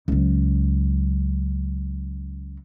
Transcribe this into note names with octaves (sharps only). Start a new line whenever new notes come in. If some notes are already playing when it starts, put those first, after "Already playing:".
C#2 F#3